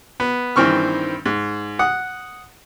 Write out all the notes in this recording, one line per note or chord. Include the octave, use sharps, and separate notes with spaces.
B3
G2 D#3 E3 C4 C#6 F6
G#2
F#5 D#6